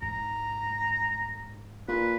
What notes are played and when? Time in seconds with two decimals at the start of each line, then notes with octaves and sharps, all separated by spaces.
0.02 G#2 A#5
1.88 A#2 B4